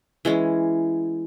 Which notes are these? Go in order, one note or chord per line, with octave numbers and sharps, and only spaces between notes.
E3 G#3 C#4